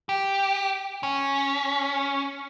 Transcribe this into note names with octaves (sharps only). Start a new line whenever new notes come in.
G4
C#4